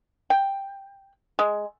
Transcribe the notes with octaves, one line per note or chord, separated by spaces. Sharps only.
G5
G#3